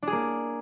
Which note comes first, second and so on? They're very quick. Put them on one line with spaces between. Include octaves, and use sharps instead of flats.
D4 G#4 A#3